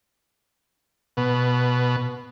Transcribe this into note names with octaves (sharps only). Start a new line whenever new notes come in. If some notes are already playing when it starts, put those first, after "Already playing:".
B2